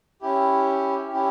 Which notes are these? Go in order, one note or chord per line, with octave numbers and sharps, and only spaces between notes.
C#4 E4 G4
C#4 E4 G4